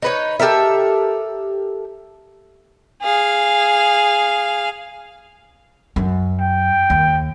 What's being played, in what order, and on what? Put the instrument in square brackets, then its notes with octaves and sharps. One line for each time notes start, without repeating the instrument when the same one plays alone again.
[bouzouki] D#4 B4 C#5
G4 A4 A#4 E5
[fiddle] G#4 F5
[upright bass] F#2
[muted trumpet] G5
[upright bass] D#2